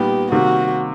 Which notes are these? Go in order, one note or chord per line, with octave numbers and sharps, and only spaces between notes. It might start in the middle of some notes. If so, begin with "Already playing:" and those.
Already playing: A#2 G3 B3 D#4 G4
C3 D#3 G3 A#3 F#4